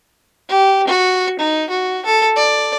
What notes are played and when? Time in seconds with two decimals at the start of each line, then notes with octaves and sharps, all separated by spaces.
0.49 G4
0.88 F#4
1.39 D#4
1.70 F#4
2.05 A4
2.36 D5